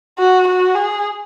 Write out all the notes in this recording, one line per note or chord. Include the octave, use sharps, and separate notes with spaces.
F#4
F#4
G#4